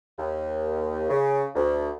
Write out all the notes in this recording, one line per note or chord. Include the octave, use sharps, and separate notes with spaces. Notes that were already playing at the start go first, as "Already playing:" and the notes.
D#2
C#3
D2